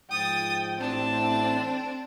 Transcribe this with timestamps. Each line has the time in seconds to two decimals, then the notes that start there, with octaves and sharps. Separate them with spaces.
0.11 G#2 F3 G5 D#6 A6
0.80 A1 A2 C4 D4 A5